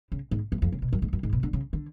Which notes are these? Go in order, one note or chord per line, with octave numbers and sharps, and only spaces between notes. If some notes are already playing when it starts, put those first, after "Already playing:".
C#3
G#2
F#2
F2
C#3
B2
F#2
G#2
F#2
G#2
B2
D3
C#3
D3